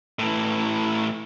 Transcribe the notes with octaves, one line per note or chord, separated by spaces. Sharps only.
A2 E3